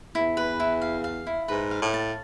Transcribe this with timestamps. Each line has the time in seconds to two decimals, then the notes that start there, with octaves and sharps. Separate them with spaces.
0.15 E2 E4
0.37 B4
0.60 E4
0.82 F5
1.04 F5
1.27 E4
1.48 G#2 B4
1.71 F5
1.82 A2
1.94 A5